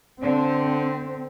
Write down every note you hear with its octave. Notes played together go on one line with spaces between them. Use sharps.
D3 C4